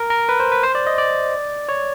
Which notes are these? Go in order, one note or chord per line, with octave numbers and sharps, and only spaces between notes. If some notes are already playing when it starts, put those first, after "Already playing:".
Already playing: A#4
A#4
B4
C5
B4
C5
D5
D#5
D5
C#5